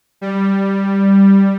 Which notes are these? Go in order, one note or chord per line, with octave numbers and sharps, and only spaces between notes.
G3